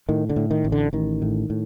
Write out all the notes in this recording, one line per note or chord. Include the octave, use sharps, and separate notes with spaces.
A2 D#3
D3
A2
D#3
A1
D3
A1 D#3
A2
A2